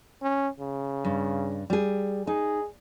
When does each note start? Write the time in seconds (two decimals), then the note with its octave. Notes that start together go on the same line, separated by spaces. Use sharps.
0.22 C#4
0.59 C#3
1.04 G2
1.70 G3 G#4
2.27 D#4 G#4